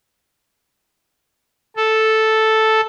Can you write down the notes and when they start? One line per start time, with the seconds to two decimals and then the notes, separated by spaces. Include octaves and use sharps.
1.76 A4